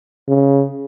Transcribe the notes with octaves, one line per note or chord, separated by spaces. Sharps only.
C#3